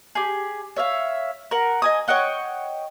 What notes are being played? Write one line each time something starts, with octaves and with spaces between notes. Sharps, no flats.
G4 G#4
C#5 E5 F5
A#4 F#5
D#5 G#5 D#6
C#5 D#5 F#5 G5